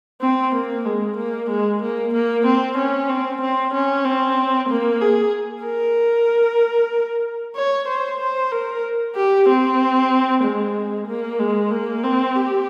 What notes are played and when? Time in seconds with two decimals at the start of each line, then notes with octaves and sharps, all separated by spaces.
0.21 C4
0.54 A#3
0.85 G#3
1.17 A#3
1.50 G#3
1.82 A#3
2.13 A#3
2.46 C4
2.78 C#4
3.09 C4
3.41 C4
3.74 C#4
4.05 C4
4.69 A#3
5.01 G#4
5.64 A#4
7.55 C#5
7.88 C5
8.20 C5
8.52 A#4
9.15 G4
9.48 C4
10.43 G#3
11.07 A#3
11.39 G#3
11.71 A#3
12.03 C4
12.35 G4